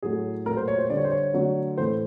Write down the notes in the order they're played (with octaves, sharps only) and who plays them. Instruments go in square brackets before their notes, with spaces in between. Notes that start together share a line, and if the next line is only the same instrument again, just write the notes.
[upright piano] A2 F#3 A3 G#4
A#2 F#3 A3 A#4
C5
C#5
C5
D3 G3 D5
C#5
C5
C#5
D3 F#3 A3
A2 E3 A3 C5